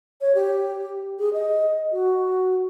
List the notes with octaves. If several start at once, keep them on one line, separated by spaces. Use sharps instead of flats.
C#5
G4
G#4
D#5
F#4